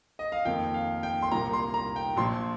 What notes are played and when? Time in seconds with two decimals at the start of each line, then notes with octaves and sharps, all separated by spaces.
0.19 D#5
0.32 F5
0.45 F2 D#3 A#3 G5
0.74 F5
1.03 G5
1.22 C6
1.32 C2 A#2 A#3 A#5
1.53 C6
1.74 A#5
1.96 G5
2.17 A#1 A#2 F3 C6